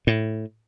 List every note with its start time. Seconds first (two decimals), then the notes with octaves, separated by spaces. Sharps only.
0.07 A2